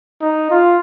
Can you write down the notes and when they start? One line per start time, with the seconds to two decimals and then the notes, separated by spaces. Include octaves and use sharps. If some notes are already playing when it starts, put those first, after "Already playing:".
0.22 D#4
0.51 F4